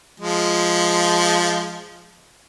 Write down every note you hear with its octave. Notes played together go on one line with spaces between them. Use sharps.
F3 G#3